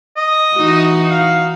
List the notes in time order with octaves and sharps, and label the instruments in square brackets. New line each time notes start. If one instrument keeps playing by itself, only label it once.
[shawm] D#5
[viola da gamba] E3 D#4 F#4
[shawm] F5